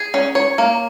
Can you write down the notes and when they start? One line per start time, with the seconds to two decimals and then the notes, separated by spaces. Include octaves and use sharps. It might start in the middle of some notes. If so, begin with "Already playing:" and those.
Already playing: G#4
0.14 C#4
0.35 C#5
0.58 A#3